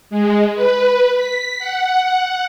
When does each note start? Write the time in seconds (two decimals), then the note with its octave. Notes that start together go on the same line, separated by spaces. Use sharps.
0.10 G#3
0.55 B4
1.17 B6
1.59 F#5